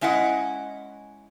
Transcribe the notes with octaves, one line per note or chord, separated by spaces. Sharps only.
G#3 C#4 E4 D#5 F#5